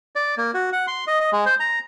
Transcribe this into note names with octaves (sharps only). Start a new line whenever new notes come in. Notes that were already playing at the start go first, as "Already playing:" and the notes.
D5
A#3
F#4
F#5
C6
D#5
D#5
G#3
C5
A#5